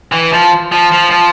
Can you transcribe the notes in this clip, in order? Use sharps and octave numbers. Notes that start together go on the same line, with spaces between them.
E3
F3
F3
F3
F3